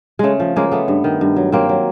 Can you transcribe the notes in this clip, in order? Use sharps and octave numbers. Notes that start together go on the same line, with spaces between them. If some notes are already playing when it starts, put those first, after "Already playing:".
C#3 G#3 A3
F3
C#3 G#3 A#3
G#3 A3 B3
G2
D#3
G2
F#3
F#3 A#3 C4
F#3